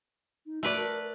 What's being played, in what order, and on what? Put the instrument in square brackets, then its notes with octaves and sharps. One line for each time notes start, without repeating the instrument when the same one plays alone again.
[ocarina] D#4
[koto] A3 B4 D5 [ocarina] F#4
[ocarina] A#4